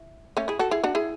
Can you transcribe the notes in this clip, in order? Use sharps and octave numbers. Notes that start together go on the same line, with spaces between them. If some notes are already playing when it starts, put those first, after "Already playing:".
Already playing: E4
A3 C#4
E4 G#4
F#4 A4
E4 G#4
D4 F#4
E4 G#4